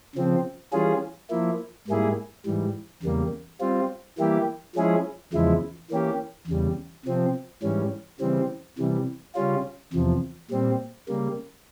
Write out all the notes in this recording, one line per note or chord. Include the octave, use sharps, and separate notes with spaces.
C#3 F3 C4
E3 G3 C#4 F4 G#4
F3 A#3 E4
G#2 G3 A#3 E4 G#4
G#2 E3 G3
E2 C#3 G3 A#3
G3 C4 F4
E3 G3 A#3 E4 G4
F3 G#3 C#4 E4 G#4
E2 C#3 F3 G#3 E4
E3 A#3 C#4 G4
E2 C#3 G3
C3 F3 C4
G#2 E3 G3 C#4
C#3 E3 G3 C4
C3 E3 G3
C#3 G3 C#4 F4
E2 C3 F3
A#2 G3 C4
C#3 G3 A#3